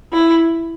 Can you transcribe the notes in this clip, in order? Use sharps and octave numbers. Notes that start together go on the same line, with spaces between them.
E4